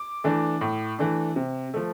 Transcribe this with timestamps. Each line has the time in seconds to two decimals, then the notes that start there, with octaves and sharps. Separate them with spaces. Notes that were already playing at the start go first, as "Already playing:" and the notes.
Already playing: D6
0.24 E3 A3 D4
0.61 A2
0.99 E3 A3 D4
1.36 C3
1.74 F3 A3